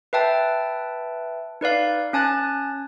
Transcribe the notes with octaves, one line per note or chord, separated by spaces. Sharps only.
B4 E5 G5 A5
D#4 B4 D5 F5
C#4 G#5 A5 F#6 A6